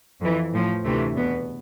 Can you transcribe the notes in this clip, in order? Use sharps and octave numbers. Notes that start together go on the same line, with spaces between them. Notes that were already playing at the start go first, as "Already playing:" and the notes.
F2 E3
A2 F3
D2 C3 E3 A3
E2 B2 B3